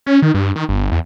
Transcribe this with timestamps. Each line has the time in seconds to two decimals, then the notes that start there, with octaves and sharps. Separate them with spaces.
0.06 C#4
0.22 D#3
0.34 G2
0.56 D#3
0.69 G1
0.92 E2